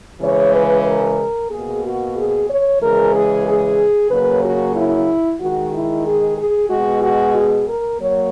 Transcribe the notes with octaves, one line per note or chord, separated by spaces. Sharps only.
C#3 E3 G#3 C#5
B4
A#4
B2 A#3 G#4
F#4
G#4
C#5
C#3 E3 G#3 A#4
G#4
G#4
C#3 F#3 A#3 B4
F#4
E4
D#3 G#3 F#4
E4
G#4
G#4
B2 G#3 F#4
F#4
G#4
A#4
F#3 A#3 C#5